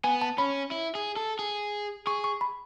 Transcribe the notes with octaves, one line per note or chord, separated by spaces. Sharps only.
B3 G#5
A5
C#4 B5
E4
G#4
A4
G#4
G#4 C#6
C#6
B5